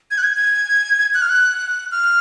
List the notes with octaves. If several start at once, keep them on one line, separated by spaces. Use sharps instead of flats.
G#6
F#6
G#6
G#6
F#6
F6
F#6
F6